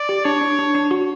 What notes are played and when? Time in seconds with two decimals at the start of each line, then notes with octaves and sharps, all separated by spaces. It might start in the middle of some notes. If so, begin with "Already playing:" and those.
Already playing: D5
0.09 G4
0.24 D4 C#5
0.41 D4
0.59 D4
0.75 D4
0.91 F#4